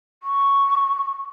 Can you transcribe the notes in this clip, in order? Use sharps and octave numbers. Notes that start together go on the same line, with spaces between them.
C#6